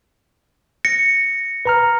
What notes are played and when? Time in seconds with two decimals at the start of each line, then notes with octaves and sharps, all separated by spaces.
0.85 A#6 C#7
1.65 B4 A#5 F6